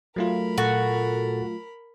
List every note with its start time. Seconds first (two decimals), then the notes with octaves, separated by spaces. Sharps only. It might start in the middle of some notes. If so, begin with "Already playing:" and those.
0.16 F#3 A3 F4 A#4 B5
0.58 A#2 F#4 A4 A6